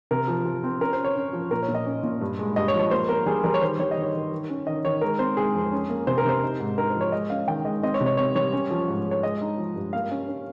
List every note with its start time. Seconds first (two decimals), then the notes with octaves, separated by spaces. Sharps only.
0.11 C3 A#4
0.28 F3
0.45 F3
0.63 C4
0.81 C#4 A#4
0.93 C5
0.99 C#4
1.04 C#5
1.15 C#4
1.33 F3
1.51 A#2 A#4
1.63 C#5
1.68 A#2
1.75 D#5
1.86 C#4
2.03 A#2
2.21 G2
2.39 G#3
2.56 G2 D#5
2.68 C#5
2.74 F3
2.79 C#5
2.91 A#3 C5
3.09 A#3 A#4
3.26 G3 G#4
3.44 G3 A#4
3.54 C#5
3.62 D#3 C5
3.79 G3 C#5
3.91 D#5
3.97 D#3
4.03 C#5
4.15 D#3
4.32 D#3
4.49 C#4
4.67 D#3 D#5
4.85 D#3 C#5
5.01 G#3 A#4
5.19 C4 C5
5.37 G#3 G#4
5.55 F2
5.72 C#4
5.90 A#3
6.07 C3 C5
6.18 A#4
6.25 C3 C5
6.43 D#4
6.60 G#2
6.77 D#4 A#4
6.90 C5
6.95 F3
7.01 C#5
7.12 G#3 D#5
7.30 C#4 F5
7.48 D#3 G5
7.65 G#3 D#5
7.83 C4 D#5
7.94 C#5
8.00 C3
8.06 C#5
8.17 C4 C#5
8.35 G3 C#5
8.53 C#4
8.71 F3
8.88 G#2
9.06 G#3
9.11 C#5
9.23 G#3 D#5
9.41 D#4
9.58 F3
9.76 G2
9.93 A#3 F5
10.11 C#4
10.28 C#4